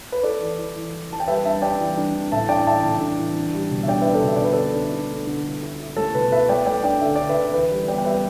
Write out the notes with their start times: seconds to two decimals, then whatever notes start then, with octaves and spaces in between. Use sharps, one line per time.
0.12 B4
0.23 E4 A4 D5
0.40 E3
0.58 E3
0.76 E3
0.93 E3
1.10 E3 A5
1.20 G5
1.28 G3 B4 E5
1.45 D4 E5 A5
1.62 G3 D5 G5
1.80 E3
1.97 D4
2.14 E3
2.32 A2 E5 A5
2.49 D4 D5 G5
2.67 E3 E5 A5
2.84 A2
3.01 D4
3.19 E3
3.36 D4
3.54 G3
3.71 B2
3.83 E5
3.88 D4 D5 G5
4.01 D4 B4 E5
4.14 A4 D5
4.23 B2 E5
4.36 D5
4.41 D3 B4
4.53 D3 A4 D5
4.75 D4
4.93 D4
5.10 A3
5.27 D3
5.45 E4
5.62 E4
5.80 E4
5.97 A3 A4
6.14 B2 B4
6.32 E4 B4 E5
6.49 A3 D5 G5
6.66 A3 D5 G5
6.83 D4 D5 G5
7.01 D3 E5
7.16 D3 D5
7.29 B4 E5
7.36 D3
7.53 E3 B4
7.71 G3
7.87 B3 D5 G5
7.98 G5
8.05 G3 B4 E5